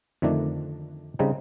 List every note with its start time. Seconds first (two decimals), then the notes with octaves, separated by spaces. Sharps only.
0.22 F2 D3 D#3 A3 D4
1.19 C#3 G3 C4 D#4